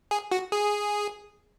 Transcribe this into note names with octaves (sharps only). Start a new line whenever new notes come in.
G#4
F#4
G#4